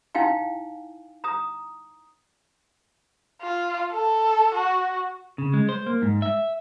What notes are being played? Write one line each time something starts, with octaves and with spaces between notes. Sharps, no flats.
D#4 E4 F5 G5 G#5
A#5 D#6
F4
A4
F#4
C#3
G#3
C5
A#3
G#2
E5